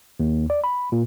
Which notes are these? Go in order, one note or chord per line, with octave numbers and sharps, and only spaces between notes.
D#2
D5
B5
A#2